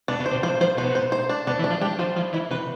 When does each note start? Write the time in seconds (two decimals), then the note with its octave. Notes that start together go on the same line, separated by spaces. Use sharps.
0.08 B2 D4
0.20 B2
0.26 C5
0.31 C3
0.43 F3 C5
0.60 F3 C5
0.77 B2 C5
0.95 C5
1.12 C5
1.29 D4
1.47 B2 D4
1.59 E3
1.64 D4
1.70 F3
1.81 G3 D4
1.99 F3 C5
2.16 F3 E4
2.33 E3 E4
2.51 C3 B4